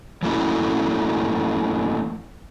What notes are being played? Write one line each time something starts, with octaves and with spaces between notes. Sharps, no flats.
E3 F#3 A3 A#3 C#4 E4